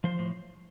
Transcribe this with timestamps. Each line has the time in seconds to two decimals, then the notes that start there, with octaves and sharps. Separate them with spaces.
0.04 F3 C5
0.19 A2